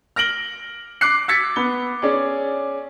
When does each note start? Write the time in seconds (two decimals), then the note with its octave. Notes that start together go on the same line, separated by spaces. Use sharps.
0.16 F6 A#6 D7 F#7 G7
1.01 D6 F#6 C7
1.28 E6 G#6 A6 B6 C#7
1.56 B3 G7
2.02 C#4 G#4 D5